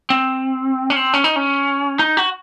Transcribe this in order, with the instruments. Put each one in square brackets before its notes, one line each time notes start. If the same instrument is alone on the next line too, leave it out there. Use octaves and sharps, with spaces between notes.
[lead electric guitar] C4
C#4
C4
C#4
D#4
C#4
D#4
F#4